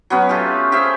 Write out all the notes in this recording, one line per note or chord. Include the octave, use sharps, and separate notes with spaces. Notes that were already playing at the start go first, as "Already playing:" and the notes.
F#3 B3 C#4
A3 F4 G4
G4 G#4 C5 E5